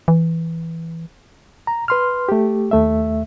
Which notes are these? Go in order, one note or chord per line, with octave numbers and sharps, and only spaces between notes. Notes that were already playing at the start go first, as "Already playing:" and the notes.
E3
A#5
B4 C6 F6
A3 G4
D#2 A3 E5